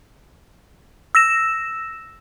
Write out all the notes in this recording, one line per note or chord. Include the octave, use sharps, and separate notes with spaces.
E6 A#6 E7